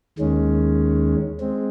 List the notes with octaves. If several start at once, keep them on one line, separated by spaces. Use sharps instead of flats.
D#2 D#3 G#3 C#4
G#3 C4